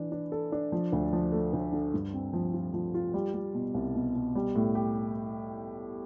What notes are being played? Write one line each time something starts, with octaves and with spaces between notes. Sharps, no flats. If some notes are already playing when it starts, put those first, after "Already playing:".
Already playing: E3 D4
D4
A4
D4
F3
D2
F3
A3
D2
D3
G2
C4
F3
F4
F3
F4
G3
G3
B2
C2
B2
B2
G3
A2
G4